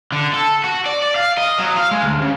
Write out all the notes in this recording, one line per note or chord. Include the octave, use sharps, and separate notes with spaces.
D3
A4
F#4
D5
D5
F5
D#5
F#3
F5
G#3
D2
C#3